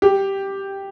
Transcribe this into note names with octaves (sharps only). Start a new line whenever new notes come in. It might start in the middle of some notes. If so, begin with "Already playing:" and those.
G4